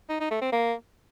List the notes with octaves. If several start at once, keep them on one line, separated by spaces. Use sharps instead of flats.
D#4
D#4
A3
C4
A#3